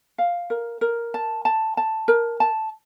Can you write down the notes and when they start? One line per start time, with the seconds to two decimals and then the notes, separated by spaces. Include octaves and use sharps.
0.18 F5
0.50 A#4
0.81 A#4
1.14 A5
1.45 A5
1.77 A5
2.08 A#4
2.40 A5